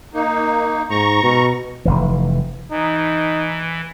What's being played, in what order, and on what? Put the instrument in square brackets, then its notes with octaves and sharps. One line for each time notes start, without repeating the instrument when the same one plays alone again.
[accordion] A#3 D#4
[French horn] G#2 [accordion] A#5 C#6
[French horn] B2
[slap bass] F1 A#1 E3
[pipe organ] E3 [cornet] D#4